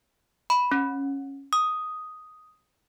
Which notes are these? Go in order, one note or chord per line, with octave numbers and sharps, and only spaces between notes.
B5
C#4
D#6